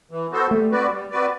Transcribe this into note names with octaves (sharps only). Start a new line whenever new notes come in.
E3
B3 F#4 A4 C5
G3 A3
C4 F#4 B4 D5
G3
C4 F#4 B4 D5